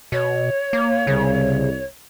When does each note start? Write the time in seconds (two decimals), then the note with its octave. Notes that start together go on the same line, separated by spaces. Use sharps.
0.12 B2 C#5
0.73 A#3
1.07 C2 C#3